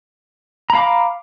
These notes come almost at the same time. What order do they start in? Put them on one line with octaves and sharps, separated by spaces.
A#5 B5 F5 D6